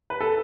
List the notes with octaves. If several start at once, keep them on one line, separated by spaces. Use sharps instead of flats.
B4
A4